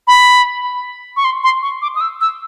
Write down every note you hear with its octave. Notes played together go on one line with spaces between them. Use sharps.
B5
C#6
C6
C6
C#6
D6
D#6
E6
E6